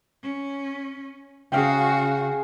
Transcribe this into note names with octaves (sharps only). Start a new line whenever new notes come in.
C#4
C#3 F#4 G#4 F5 G5